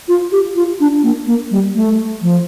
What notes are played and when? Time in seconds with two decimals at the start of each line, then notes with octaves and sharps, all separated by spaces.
0.08 F4
0.32 G4
0.56 F4
0.80 D4
1.03 A#3
1.27 A#3
1.51 G3
1.75 A3
2.22 F3